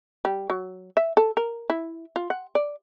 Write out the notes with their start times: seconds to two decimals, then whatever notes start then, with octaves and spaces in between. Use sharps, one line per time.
0.25 G3
0.50 F#3
0.97 E5
1.17 A4
1.37 A#4
1.70 E4
2.16 F4
2.30 F#5
2.55 D5